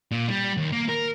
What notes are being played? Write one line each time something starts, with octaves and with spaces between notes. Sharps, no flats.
A#2
G3
D#2
A#3
A#4